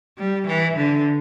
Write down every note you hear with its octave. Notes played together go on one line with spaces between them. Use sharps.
G3
E3
D3